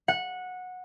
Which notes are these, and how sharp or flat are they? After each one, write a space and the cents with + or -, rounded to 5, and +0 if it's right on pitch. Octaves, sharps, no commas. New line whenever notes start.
F#5 -15